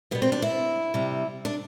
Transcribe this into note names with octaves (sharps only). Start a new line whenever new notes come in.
B2 G3 B3
C4
D4
E4
C3 G3
D4